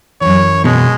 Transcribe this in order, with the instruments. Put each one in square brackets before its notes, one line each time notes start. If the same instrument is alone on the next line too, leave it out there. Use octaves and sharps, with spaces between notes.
[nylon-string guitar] F#2 E3 [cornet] C#5
[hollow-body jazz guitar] B2 [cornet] G#3